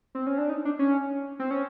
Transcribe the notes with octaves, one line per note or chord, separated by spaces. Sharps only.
C4
C#4
D4
D#4
D4
C#4
C4
C#4